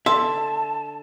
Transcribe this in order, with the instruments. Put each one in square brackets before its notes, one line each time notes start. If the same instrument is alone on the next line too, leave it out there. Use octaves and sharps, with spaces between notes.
[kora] D3 [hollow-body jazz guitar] E5 [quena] A5 [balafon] C6